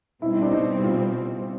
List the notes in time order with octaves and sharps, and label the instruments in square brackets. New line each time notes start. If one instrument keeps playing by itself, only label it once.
[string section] B2 G3 C4 [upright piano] E4
[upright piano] D#4
D4
D#4
F4